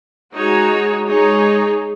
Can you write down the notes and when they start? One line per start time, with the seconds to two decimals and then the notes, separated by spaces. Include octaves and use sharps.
0.33 G#3 D#4 F#4 C#5
1.08 G#3 D#4 G#4 C#5